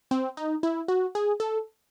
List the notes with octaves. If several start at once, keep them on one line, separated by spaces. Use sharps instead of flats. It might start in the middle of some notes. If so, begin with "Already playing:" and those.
C4
D#4
E4
F#4
G#4
A4